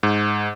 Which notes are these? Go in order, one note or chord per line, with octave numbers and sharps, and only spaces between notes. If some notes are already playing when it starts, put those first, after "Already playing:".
G#2